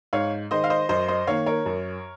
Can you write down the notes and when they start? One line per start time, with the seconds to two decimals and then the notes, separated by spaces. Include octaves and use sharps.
0.13 G#2 C#5 F5
0.51 D#3 G#3 C5 D#5
0.64 F5
0.70 C5 D#5
0.89 F#2 C5 D#5
1.08 C5 D#5
1.27 D#3 A#3 C#5 F5
1.46 A#4 C#5
1.66 F#2